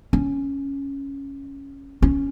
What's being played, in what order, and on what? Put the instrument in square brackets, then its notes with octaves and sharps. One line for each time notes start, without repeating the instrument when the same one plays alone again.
[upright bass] C#4
C#4